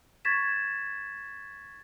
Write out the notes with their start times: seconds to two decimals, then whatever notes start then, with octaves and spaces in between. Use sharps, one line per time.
0.25 C#6 G#6 A6 B6 E7